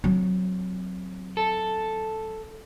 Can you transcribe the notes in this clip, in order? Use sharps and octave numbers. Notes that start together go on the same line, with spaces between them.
F#3 C4
A4